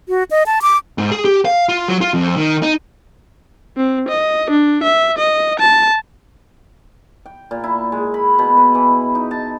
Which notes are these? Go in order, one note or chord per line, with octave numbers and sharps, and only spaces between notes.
F#4
D#5
A5
D6
G#2
G#4
G4
F5
F4
F#3
F4
F2
D#3
D#4
C4
D#5
D4
E5
D#5
A5
G5
A#2
E4
G#3
B5
B2
B4
E3
D#4
A5